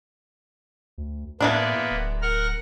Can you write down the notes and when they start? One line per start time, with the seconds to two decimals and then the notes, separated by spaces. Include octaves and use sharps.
0.98 D2
1.40 A2 E3 G#3 A#3 B3 D4
1.91 D1
2.22 A#4 F#5 F6